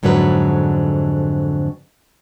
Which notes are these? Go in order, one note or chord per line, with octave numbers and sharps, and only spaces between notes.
F2 G#2 D3 F#3 B4